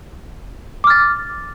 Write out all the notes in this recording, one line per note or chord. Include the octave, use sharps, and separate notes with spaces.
D6 F6 A6